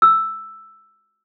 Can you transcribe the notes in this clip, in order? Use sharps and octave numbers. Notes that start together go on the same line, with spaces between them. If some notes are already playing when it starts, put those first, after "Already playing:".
E6